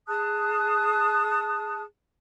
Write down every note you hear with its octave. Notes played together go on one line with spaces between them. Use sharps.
G#4 A5 D#6 F#6